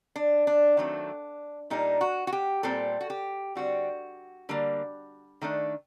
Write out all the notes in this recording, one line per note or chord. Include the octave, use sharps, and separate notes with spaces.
D4
D4
D#3 F#3 A3 C4
A#2 G3 A#3 D4 D#4
F#4
F#4
G4
A#2 G3 C4 A4
F#4
G4
D3 G3 C4 F#4
D3 G3 A#3
D#3 A3 D4